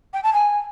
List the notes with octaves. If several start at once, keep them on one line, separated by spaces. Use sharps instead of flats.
G5
A5
G#5